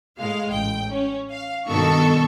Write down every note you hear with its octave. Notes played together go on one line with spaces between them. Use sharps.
A2 G#3 F5
A1 G5
C#4
F5
G2 B2 D#3 A4 C#6